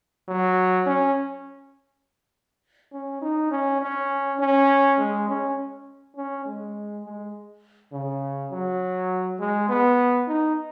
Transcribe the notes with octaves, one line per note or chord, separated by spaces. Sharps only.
F#3
C#4
C#4
D#4
C#4
C#4
C#4
G#3
C#4
C#4
G#3
G#3
C#3
F#3
G#3
B3
D#4